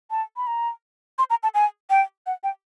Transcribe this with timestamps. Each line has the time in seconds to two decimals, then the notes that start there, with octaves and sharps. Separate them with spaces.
0.11 A5
0.37 B5
0.47 A#5
1.19 C6
1.30 A#5
1.43 A5
1.54 G#5
1.90 G5
2.26 F#5
2.44 G5